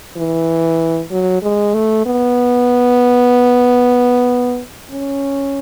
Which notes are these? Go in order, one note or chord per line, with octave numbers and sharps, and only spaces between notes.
E3
F#3
G#3
A3
B3
C#4